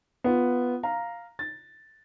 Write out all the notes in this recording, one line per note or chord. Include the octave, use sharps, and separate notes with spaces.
B3 F4
F5 A#5
A6